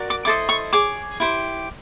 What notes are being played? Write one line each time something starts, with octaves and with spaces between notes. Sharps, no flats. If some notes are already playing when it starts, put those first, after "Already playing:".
Already playing: F#4 A#4 D5
D6
E4 A4 C5 D#5 D6
C#6
G#4 C#5 D6
E4 G4 C5